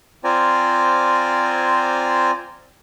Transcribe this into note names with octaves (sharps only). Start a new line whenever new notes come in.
C4 F4 C5 D5 G#5 A#5